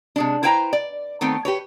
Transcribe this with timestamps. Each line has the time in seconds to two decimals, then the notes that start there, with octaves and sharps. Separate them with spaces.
0.16 C3 G#3 D4
0.43 E4 B4 C5 G5 G#5 A#5
0.73 D5
1.21 D#3 A3 B3 C4
1.45 G4 B4 C#5